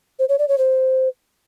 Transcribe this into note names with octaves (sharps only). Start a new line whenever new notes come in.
C5
C#5
D5
C#5
C5